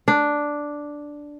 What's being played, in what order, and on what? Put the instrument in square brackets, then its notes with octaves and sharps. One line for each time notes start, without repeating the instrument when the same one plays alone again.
[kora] D4